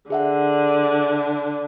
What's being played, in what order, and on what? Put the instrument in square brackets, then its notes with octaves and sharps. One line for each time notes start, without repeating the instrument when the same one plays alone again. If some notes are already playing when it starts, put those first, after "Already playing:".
[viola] D3 [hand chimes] G#4 E5 F#5